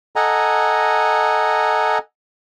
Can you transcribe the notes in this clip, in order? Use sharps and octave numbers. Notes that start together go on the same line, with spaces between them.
A4 D#5 F#5 G#5 A#5